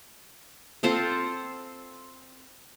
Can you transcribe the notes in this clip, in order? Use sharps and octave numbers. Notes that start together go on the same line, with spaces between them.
C4 F4 A4 C5